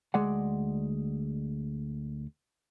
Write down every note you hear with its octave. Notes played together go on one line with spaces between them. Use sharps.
D2 G#3 D5 F#5